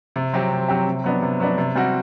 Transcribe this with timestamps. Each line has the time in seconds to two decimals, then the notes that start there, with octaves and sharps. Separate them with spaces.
0.16 C3
0.33 F#3 C4 G4
0.51 C3
0.68 F#3 C4 G4
0.87 C3
1.04 F#3 B3 D4
1.22 C3
1.40 F#3 B3 D4
1.58 C3
1.75 G3 C4 F#4